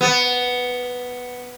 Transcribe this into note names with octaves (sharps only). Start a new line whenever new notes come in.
B3